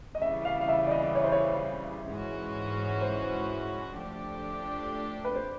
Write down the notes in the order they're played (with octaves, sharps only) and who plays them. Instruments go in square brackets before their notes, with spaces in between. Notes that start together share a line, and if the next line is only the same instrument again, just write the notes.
[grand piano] D#5
[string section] C#3 E3 G3 [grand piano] E5
[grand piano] F5
F5
E5
D5
D#5
C#5
C5
C#5
[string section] G#2 E3 G#3 C#4 F#4
[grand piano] C5
[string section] F3 A3 D4 G4
[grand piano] B4
C5